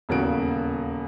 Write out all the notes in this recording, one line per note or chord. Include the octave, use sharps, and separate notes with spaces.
D#1 E2 C#3 A#3 F#4 D7